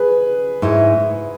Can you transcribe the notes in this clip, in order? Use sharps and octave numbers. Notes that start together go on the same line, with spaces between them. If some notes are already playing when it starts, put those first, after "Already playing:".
Already playing: G#4 B4
G#2 G#3 E4 C#5